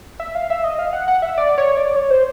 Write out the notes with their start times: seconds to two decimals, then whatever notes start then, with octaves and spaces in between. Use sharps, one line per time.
0.20 E5
0.35 F5
0.50 E5
0.64 D#5
0.79 F5
0.93 F#5
1.08 F#5
1.22 E5
1.38 D5
1.58 C#5
1.77 D5
1.96 C#5
2.11 C5